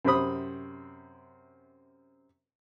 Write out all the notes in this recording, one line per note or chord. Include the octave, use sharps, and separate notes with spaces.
F#2 C3 C4 C5 B5 D#6